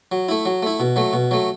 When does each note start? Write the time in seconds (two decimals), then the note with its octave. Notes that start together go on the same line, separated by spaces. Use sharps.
0.12 F#3
0.29 A3 E4
0.46 F#3
0.63 A3 E4
0.80 B2
0.96 F#3 A3
1.13 B2
1.31 F#3 A3